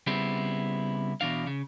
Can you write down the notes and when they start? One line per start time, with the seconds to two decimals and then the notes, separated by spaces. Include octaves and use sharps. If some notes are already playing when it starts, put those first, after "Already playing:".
0.07 C#3 G3 B3 C4 E4 G#4
1.21 B2 E3 D4 F5
1.47 C#3